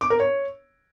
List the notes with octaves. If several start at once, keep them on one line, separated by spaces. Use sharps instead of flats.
D6
A#4
C#5